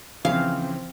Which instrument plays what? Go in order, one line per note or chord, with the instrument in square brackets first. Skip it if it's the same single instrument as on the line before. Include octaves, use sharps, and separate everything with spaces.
[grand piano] C#3 E3 [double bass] F3 C4 [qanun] F5